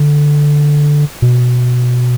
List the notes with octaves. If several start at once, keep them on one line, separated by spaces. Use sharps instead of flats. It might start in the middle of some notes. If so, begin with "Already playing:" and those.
Already playing: D3
B2